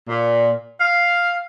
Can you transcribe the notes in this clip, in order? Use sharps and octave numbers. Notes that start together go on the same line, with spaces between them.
A#2
F5